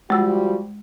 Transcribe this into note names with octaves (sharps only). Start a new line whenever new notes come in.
F3 G3 G#3 F#4 E6